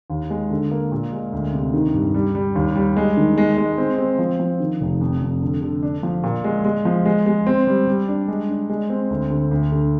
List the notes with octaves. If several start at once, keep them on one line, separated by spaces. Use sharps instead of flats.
D#2
G#3
D3
A#3
A#2
G#3
D2
C3
D#3
G2
G3
G3
D#2
G3
G#3
D#3
G#3
G#3
C4
C4
F3
F3
D#3
F1
F2
F2
D3
D3
D4
F3
A#2
G#3
G#3
F3
G#3
G#3
C4
G3
G3
D4
G#3
D4
G#3
C4
D2
D3
D2
D3